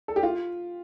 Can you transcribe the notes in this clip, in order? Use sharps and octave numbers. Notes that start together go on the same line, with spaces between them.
A4
G4
F4